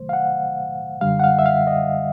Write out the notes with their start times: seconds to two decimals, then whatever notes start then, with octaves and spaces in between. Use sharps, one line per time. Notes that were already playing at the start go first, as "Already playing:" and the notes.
Already playing: C2 C3 D#3 F#3 A3 C5
0.09 F5
0.13 F#5
1.01 F#2 D3 G3 F5
1.20 F#5
1.24 F5
1.39 E5
1.46 F5
1.67 D#5